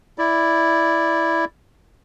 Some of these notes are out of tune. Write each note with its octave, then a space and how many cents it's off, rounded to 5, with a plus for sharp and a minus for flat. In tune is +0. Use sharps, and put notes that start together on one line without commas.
E4 +0 D5 +0